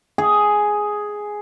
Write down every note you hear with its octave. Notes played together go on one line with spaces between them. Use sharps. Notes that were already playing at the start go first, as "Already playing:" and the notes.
G#4